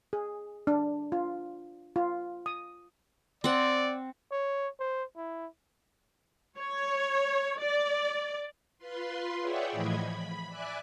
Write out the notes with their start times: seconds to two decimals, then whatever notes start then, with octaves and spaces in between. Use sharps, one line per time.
0.13 G#4
0.67 D4
1.12 F4
1.96 F4
2.46 D#6
3.44 C4 D5 F#5
4.32 C#5
4.80 C5
5.17 E4
6.58 C#5
7.60 D5
8.78 F4 B4 C6
9.39 G#4 C#5 D5 E5 F#5 G5
9.71 A2 E3 F3 D#5 B5 G#6
10.07 B5
10.48 D5 E5 G#5 D6 F#6